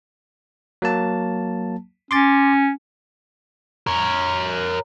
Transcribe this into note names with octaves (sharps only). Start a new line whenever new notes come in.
F#3 A#3 A5
C#4 C6 D6 A6
A#4 C#5